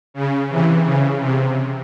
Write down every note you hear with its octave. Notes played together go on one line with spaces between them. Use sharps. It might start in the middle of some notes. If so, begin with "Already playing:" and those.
C#3
C3 E3
C#3
C3